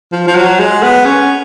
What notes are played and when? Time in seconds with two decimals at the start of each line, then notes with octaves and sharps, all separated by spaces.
0.12 F3
0.27 F3
0.35 F#3
0.59 G#3
0.83 B3
1.05 C#4